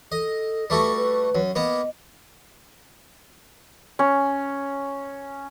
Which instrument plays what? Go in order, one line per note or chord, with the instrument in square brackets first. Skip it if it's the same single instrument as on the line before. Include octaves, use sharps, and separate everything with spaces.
[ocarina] A4 [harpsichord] D#5
[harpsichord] G3 A3 F#4 [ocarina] B4
[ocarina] B4
[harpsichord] F#2
[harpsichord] A#3 B3 [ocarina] D#5
[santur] C#4